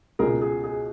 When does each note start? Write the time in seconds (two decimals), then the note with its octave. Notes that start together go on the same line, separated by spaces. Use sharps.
0.19 C#2 B2 G#4 A#4
0.42 G#4
0.64 G#4